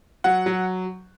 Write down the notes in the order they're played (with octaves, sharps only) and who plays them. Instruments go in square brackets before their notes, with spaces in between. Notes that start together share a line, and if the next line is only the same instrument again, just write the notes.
[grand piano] F#3 F#5
F#3